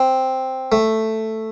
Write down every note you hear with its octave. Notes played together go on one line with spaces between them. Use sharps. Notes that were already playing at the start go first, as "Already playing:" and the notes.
Already playing: C4
A3